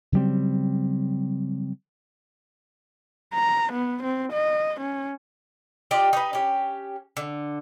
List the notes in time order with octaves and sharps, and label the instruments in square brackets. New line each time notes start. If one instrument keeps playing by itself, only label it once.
[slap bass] C#3 F#3 G3 C4
[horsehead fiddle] A#5
B3
C4
D#5
C#4
[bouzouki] F4 G4 D5 D#5
D#4 B4
C#4 G4
D3